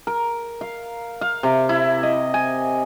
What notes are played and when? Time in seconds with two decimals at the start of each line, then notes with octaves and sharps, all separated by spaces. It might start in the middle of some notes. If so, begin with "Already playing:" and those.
0.07 A#4
0.61 F5
1.21 F5
1.43 C3
1.69 E4
2.03 D#5
2.34 G#5